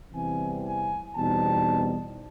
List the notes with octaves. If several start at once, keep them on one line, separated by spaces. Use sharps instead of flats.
E2 C3 E3 G3 C4 G#5
G#5
E2 B2 G3 C4 D#4 A5